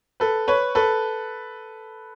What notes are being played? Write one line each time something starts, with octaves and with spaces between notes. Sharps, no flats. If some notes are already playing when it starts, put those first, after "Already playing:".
A4 B4
B4 C#5
A4 B4